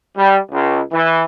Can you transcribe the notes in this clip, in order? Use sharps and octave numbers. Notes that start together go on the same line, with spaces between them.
G3
C#2
E3